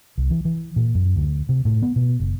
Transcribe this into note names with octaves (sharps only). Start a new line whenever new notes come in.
C2
E3
E3
A#2
F#2
D2
C3
A2
B3
B2
F#1